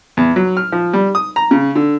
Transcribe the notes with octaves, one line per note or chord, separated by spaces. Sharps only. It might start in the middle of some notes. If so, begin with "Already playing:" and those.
E2
F#3
F6
F3
G3
D#6
A#5
C#3
D3